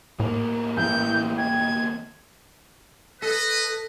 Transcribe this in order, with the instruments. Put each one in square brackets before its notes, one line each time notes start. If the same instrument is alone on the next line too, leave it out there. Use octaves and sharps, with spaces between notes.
[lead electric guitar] E2 A#3 [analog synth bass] A2
[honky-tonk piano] A1 E4 [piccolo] G6
[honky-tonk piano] G5 [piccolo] G#6
[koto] A4 [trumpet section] B4 D#5